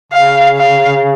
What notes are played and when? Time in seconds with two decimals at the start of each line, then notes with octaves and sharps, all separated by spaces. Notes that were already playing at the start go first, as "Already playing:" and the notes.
0.12 C#3 F5
0.57 F5